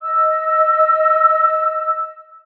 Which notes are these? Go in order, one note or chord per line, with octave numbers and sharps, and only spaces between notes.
D#5 E6